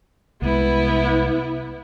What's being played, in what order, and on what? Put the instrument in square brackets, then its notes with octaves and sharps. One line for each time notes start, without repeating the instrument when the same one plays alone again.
[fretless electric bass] C2 G#3 [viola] B3 E4